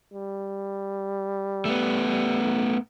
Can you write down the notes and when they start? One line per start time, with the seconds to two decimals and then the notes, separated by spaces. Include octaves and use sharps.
0.13 G3
1.65 A3 B3
2.08 G3
2.43 B1